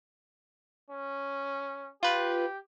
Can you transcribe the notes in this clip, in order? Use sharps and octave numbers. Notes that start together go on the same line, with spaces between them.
C#4
F4 G4 B4